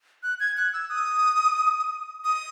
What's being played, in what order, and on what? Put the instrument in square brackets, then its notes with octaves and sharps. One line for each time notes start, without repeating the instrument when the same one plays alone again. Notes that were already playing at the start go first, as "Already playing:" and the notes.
[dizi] F#6
G#6
F#6
E6
D#6
D#6